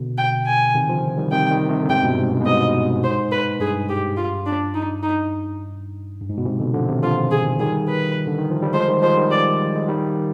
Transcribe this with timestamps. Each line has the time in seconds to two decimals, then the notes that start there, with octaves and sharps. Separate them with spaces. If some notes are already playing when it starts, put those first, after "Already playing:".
Already playing: B2 D3
0.18 G5
0.46 G#5
0.75 C3 D#3
0.89 D3 F3
1.17 D#3 G3
1.32 C3 D#3 G5
1.51 D#3 G3
1.70 C3 D#3
1.83 D3
1.89 G#2 C3 G5
2.03 G2 B2
2.18 G#2
2.32 G2
2.41 B2
2.46 G#2 D#5
3.04 C5
3.32 B4
3.60 G2 G#4
3.89 G4
4.17 F4
4.46 D4
4.75 D#4
5.03 D#4
6.21 G2
6.29 G#2
6.38 B2
6.45 G#2 C3
6.60 B2 D3
6.74 D3 F3
6.88 C3 D#3
7.02 D3 F3 F4
7.31 G#4
7.60 D#3 G3 G#4
7.88 B4
8.27 D3
8.39 D#3
8.51 F3
8.63 G3
8.73 F3 G#3 C5
8.88 D#3 G3
9.02 F3 G#3 C5
9.17 D#3 G3
9.31 D5
9.76 G#3
9.88 D#3 G3